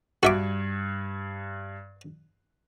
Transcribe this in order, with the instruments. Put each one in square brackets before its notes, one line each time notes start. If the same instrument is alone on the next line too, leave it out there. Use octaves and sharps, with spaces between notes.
[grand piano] G2 [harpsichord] F#4 E5 D6